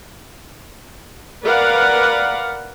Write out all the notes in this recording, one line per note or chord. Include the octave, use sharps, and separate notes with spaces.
A#4 B4 D5 F5 F#5